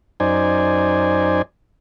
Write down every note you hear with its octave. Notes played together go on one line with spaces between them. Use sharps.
F#2 D#4 C5 D5 G#5